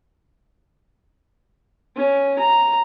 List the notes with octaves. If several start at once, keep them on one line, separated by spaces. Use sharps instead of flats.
C#4
A#5